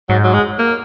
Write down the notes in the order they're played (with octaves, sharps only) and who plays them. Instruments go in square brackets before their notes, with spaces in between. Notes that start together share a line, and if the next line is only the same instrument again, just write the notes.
[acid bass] G#2 [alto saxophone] F#3
[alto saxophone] F#3
G#3
A#3